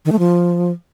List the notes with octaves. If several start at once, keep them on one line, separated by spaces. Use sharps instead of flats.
D#3
A3
F3